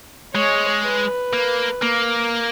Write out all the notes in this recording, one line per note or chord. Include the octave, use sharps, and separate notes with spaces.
G#3 C#5
B4
A#3
A#3